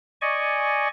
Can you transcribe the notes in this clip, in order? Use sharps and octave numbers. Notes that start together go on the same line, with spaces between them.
D5 D#5 G#5 C#6